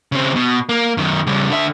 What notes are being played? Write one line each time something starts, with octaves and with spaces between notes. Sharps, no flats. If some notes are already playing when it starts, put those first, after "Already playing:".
C#3 C4
B2
A#3
F#2 D#3
C#3 G3
D3 E5